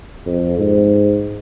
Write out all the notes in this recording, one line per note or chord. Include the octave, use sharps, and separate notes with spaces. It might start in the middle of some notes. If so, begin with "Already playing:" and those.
F2
G#2